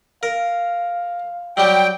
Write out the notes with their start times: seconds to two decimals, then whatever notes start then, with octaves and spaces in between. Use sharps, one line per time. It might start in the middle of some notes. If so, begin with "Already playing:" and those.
0.23 A#4 F5
1.57 F#3 G3 G4 G5